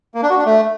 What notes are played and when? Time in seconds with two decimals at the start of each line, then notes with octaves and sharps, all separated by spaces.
0.15 A#3
0.22 D4
0.30 F#4
0.38 D4
0.46 A3